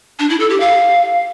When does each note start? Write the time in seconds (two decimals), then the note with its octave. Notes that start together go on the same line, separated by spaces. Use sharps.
0.19 D4
0.30 E4
0.40 A4
0.50 G4
0.60 F5